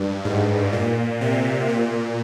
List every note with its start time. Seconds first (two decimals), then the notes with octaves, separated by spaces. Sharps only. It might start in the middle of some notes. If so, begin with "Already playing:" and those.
Already playing: G2
0.25 G#2
0.73 A#2
1.21 C3
1.69 A#2